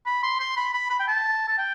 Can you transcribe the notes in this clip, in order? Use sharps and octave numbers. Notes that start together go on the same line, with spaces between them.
B5
C6
C6
B5
B5
B5
G5
A5
A5
G5